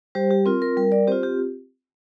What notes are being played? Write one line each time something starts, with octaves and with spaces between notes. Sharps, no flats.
G3 G4 C5
G4
C4 F4 A#4
A#4
G3 A#4
A#4 D5
C4 F4 G4 C5
G4